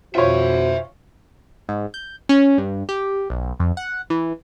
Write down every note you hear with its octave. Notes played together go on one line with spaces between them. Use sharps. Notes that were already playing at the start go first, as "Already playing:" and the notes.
F2 B2 F4 F#4 C5 C#5 E5 G#5
G#2
G6
C#4
G2
G4
B1
F2
F#5
E3